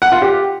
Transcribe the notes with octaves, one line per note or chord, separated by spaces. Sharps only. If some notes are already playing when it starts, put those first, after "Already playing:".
F#5
F4
G4